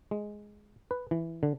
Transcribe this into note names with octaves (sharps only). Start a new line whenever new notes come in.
G#3
B4
E3
D3